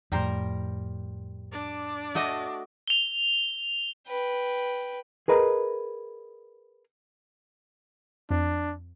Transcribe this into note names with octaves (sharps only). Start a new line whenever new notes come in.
F2 A2 G3 A#4 C5
D4 D6
A3 F#4 D#5
F7 G7
B4 G5
G#4 A#4 B4 D#5 A#5
F2 D4